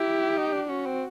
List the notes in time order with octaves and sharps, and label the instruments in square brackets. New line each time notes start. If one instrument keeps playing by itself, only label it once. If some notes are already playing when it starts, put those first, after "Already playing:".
Already playing: [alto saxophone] E4 [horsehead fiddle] G4
[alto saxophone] D#4
D4
[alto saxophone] C#4 [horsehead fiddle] F#4
[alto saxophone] C4